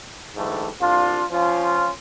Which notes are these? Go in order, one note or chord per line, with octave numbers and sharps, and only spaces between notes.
G#2 D3 E3 G3 A3
C2 D4 F4
F3 C#4 F4